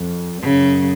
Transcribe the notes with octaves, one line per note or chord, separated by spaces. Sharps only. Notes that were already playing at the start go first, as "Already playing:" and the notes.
Already playing: F2
F#2 C#3